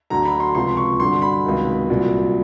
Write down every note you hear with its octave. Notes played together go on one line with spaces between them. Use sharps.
D2 D3 F#3 A#5
B5
C6
C#2 C3 F3 C6
C#6
G2 D3 F#3 C6
B5
C#2 C3 D#3 F#3
C2 A#2 F#3